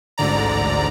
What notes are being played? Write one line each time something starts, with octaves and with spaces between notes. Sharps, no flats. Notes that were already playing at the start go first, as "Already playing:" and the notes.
A1 D2 G#2 D3 D5 A#5